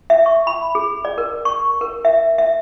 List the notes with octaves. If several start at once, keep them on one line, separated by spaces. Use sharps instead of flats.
E5
C#6
B5
G#4
D5
A#4
C#6
A#4
E5
E5